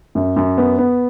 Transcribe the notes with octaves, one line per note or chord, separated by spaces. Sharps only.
F#2
F#2
B3
B3